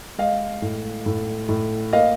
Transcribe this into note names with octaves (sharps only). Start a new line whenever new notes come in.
G#3 D#5 F5
A2
A2
A2
A#3 D#5 F5